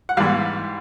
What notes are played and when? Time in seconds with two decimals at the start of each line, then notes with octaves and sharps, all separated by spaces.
0.09 F#5
0.17 G#2 E3 G3 F5